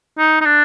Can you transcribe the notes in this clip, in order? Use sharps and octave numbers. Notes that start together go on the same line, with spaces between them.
D#4
D#4
D4